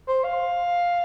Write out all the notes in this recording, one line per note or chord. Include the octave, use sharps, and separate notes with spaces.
C5
F5